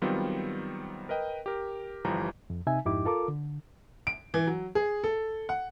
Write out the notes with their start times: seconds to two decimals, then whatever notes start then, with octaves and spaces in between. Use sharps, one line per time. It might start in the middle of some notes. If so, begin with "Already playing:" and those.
0.02 D#3 F#3 G3 B3 C4 F4
1.09 A#4 B4 D#5 G5
1.46 G4 A#4
2.05 G1 E3 F3 G3 A#5
2.50 F2
2.67 C3 D#4 E5 G#5
2.86 F2 G#2 D#4 E4 G4 D6
3.05 F4 A4 A#4 D6
3.28 D3
4.07 D7
4.34 E3
4.47 F#3
4.75 G#4
5.04 A4
5.49 F#5